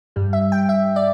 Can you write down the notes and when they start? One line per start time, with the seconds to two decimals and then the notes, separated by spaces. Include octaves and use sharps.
0.16 G2 G3
0.33 E5
0.52 G5
0.69 E5
0.96 D5